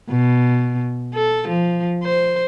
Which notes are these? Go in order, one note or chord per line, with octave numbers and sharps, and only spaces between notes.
B2
A4
F3
C5